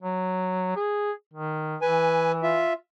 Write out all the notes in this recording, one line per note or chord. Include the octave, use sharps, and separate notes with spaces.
F#3
G#4
D#3
E3 B4 G#5
F4 E5